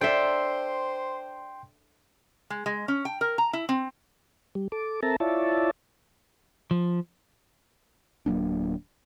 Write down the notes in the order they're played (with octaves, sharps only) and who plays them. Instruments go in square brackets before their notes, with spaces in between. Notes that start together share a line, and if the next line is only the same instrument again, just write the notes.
[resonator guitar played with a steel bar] D4 [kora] A4 E5 [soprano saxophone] C5 [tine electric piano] G5 C6
[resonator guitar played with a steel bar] G#3
G#3
C#4
G5
A#4
A#5
E4
C4
[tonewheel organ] G3
A4 D6
C4 A4 A#4 E5 A5 A#5
E4 F4 C#5 D5 E5 A5
[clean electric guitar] F3
[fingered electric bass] D1 F#3 A#3 D4